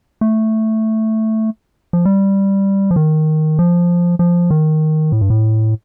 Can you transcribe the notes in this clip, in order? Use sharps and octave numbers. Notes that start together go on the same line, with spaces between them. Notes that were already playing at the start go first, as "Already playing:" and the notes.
A3
F3
G3
F3
D#3
F3
F3
D#3
A2
G2
A2